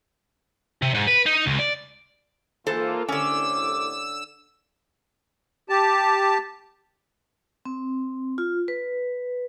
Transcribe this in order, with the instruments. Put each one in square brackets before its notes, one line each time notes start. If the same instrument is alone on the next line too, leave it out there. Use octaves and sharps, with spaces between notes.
[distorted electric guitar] C3
G#2
B4
D#4
C#2
D5
[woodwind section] G#2 E3 [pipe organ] A#3 F4 [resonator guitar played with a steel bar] A4 C5
[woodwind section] C2 A2 D6 [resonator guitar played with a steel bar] D3 C#4 [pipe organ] E6
[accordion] G4 A5
[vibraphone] C4
F4
B4